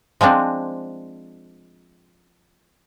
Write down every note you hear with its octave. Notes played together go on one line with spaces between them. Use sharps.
F3 G#3 C4 D4